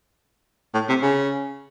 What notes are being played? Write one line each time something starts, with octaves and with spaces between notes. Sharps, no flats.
A2
C3
C#3